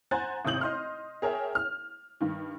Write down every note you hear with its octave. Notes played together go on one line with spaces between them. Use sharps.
C5 F#5 G#5 A#5 F#6 A6
G#1 C3 D#6 G6 F#7
D#5 C6 F6
G#4 A#4 C#5 E5 G5
F6
G2 D#3